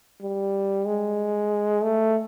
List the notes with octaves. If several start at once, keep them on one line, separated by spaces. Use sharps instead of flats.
G3
G#3
A3